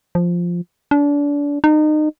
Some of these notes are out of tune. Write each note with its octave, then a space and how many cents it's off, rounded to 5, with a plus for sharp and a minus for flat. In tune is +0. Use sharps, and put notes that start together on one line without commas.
F3 +0
D4 -30
D#4 -30